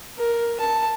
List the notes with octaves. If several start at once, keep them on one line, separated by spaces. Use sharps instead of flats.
A#4
A5